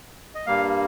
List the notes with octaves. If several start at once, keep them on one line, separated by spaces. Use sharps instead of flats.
D#5
G2 G3 A#3 F5